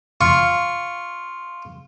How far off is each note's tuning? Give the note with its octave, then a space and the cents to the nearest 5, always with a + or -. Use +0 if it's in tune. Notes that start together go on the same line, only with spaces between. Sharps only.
F4 +0 C#6 +0